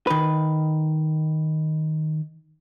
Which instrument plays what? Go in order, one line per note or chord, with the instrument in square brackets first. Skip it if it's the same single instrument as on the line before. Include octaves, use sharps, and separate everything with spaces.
[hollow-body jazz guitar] D#3 B4